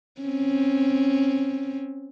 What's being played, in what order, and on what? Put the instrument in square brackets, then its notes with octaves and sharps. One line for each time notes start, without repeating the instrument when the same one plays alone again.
[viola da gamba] C4 C#4